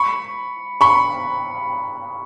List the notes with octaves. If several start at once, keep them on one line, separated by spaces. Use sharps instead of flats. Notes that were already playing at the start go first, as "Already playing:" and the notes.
Already playing: B5 C#6
B5 C#6